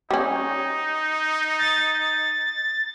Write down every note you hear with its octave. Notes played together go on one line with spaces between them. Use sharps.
G3 C#4 D#4
A6